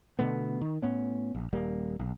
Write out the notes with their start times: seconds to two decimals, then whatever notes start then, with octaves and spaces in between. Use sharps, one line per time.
0.19 B2 D3 A3 B3
0.61 D#3
0.82 A2 B3 C#4
1.35 A#1
1.53 D#1 G3 A#3
1.99 B1